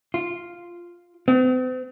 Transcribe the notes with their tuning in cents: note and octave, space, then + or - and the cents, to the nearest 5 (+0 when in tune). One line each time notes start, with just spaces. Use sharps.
F4 +0
C4 -45